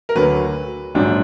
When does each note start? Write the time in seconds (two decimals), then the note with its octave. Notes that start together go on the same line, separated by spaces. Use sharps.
0.09 A#4
0.15 D2 D3 F#3 B4
0.94 A#1 G#2 F#3 D4